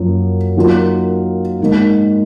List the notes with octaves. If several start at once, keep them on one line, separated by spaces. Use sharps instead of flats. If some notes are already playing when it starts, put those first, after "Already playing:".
Already playing: F#2 F3 A#3 F4
D#3 F#3 A#3 F4
G#2 D#3 A#3